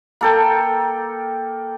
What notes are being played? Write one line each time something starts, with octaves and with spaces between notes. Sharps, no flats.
A#3 A4 G5